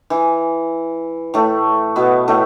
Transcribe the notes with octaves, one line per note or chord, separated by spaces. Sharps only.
E3
A2 A3
B2 B3
A2 A3